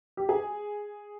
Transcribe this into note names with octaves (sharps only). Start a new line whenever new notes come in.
G4
G#4